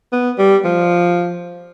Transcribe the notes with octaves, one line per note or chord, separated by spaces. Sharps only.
B3
G3
F3